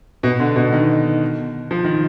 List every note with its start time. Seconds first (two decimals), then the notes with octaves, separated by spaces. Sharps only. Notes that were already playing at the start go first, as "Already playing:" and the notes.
0.23 B2
0.40 D3
0.56 B2
0.72 D#3
1.71 F3
1.84 D#3